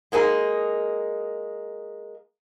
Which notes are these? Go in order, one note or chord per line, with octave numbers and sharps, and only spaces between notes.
G#3 A#3 D#4 G#4